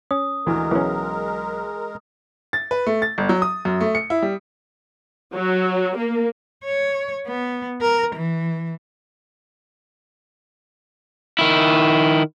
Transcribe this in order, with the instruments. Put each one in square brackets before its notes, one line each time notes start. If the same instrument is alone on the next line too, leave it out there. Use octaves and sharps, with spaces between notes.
[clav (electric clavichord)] C#4 [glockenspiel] D#6
[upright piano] D2 E3 [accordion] G#3 A#4
[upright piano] B1 [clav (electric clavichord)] E3 C#4
[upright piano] A6
B4
A3
A6
G1
F#3
D#6
F#2
A3
C#7
E4
G3
[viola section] F#3
A#3
[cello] C#5
B3
A#4
E3
[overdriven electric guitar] D#3 E4